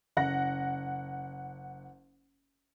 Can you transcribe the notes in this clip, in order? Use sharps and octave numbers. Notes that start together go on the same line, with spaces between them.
F#1 F#5 A#6